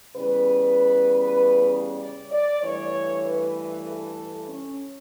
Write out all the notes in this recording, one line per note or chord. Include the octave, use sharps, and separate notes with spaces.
E2 C#3 G3 B4
D5
D5
G2 E3 A3 C#5
B4
A4
C#4